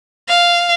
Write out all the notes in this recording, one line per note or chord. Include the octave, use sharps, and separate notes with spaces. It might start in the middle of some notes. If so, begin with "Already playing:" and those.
F5